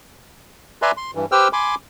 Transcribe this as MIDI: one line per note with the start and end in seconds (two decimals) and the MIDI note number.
0.82 0.91 71
0.82 0.91 74
0.82 0.91 76
0.82 0.91 80
0.82 0.91 82
0.82 0.91 84
0.97 1.11 84
1.15 1.26 43
1.15 1.26 52
1.32 1.48 67
1.32 1.48 71
1.32 1.48 72
1.32 1.48 79
1.32 1.48 88
1.32 1.48 89
1.53 1.75 80
1.53 1.75 83
1.53 1.75 84
1.53 1.75 86